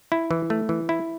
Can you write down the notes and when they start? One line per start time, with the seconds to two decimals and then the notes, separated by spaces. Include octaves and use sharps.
0.12 E4
0.31 E3
0.50 A3
0.69 E3
0.89 E4